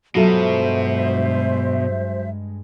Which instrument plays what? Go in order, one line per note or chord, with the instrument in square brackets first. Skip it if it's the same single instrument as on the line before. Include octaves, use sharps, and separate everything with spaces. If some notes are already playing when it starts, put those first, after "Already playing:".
[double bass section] G2 G#3 [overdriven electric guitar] B2 [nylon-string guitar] F#3 F4 A4 [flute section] C5 E5